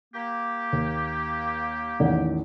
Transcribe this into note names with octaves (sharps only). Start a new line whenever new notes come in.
A#3 G4
D#2
A1 E2 D#3